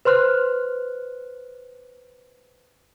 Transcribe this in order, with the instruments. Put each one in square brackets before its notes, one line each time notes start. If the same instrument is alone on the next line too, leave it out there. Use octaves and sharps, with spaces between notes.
[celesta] B4 C5 C6 F6 F#6